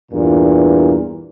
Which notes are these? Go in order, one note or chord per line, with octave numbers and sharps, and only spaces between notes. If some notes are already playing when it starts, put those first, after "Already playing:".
E2 G2 A#2